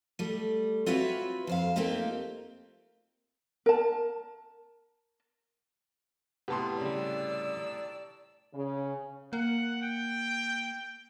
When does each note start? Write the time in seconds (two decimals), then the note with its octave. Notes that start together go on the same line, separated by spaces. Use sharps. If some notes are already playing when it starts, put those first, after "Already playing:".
0.19 G3 A3
0.86 C4 F4 F#4 B4 C#5 E5
1.47 F2 C5 F5
1.76 A3 A#3 C4 D#4 F4 G4
3.66 A#4 A5
6.48 A2 C3 B3 G4 A5 C6
6.81 C#3 G3 D5 E6
8.52 C#3
9.33 A#3 F#5
9.82 G5